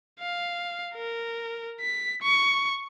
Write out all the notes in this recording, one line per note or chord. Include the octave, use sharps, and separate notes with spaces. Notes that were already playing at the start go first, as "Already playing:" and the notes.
F5
A#4
B6
C#6